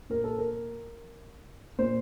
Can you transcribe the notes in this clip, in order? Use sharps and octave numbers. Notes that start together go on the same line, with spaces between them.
A#2 A#4
A4
A#4
A#2 C5